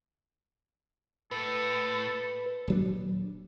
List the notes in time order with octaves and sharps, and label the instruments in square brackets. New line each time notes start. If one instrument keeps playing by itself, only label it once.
[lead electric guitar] A2 [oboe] A4 [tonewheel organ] B4
[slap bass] D#1 F#3 D4